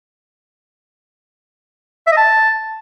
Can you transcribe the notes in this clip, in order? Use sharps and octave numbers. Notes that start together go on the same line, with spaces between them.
E5
D#5
A5